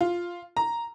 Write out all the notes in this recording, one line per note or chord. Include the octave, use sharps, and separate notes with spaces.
F4
A#5